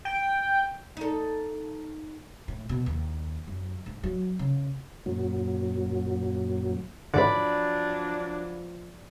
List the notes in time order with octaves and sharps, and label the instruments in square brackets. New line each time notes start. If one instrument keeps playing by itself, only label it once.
[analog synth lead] G5
[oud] D#4 A4
[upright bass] A2
B2
D#2
F#2
G#2
F#3
C#3
[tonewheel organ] F#2 A#2 F#3
[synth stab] A1 G#2 D3 [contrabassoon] F3 [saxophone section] F#3 D4 [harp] D5 B5